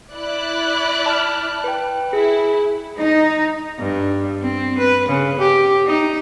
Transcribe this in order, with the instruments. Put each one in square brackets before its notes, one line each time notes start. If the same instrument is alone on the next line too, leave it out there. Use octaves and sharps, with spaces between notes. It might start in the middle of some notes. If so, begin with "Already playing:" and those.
[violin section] E4 D5 F#6
[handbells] A5 F6
B4 G5
[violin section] E4 [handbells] G#4
[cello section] D#4
[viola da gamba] G2
C4
B4
C#3
G4
D#4